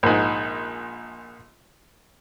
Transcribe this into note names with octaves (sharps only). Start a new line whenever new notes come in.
A#1 G#2